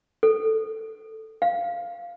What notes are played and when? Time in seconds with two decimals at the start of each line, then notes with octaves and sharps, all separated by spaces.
0.23 A4
1.42 F5